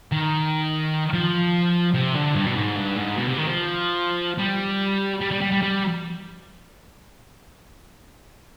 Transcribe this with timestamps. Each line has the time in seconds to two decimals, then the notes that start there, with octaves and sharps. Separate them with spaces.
0.12 D#3
1.13 F3
1.95 C3
2.15 D3
2.35 G2
2.47 B2
2.56 G#2
2.76 G2
2.97 G#2
3.17 B2
3.27 C3
3.38 D#3
3.47 F3
4.39 G3
5.21 G3
5.31 G3
5.41 G3
5.51 G3
5.62 G3